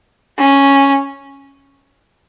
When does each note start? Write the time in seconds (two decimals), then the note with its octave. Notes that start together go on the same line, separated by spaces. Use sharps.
0.38 C#4